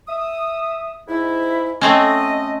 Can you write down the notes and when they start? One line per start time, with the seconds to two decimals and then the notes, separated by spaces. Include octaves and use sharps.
0.08 E5 D#6
1.08 G#2 E4
1.81 A3 C4 C#4 D#5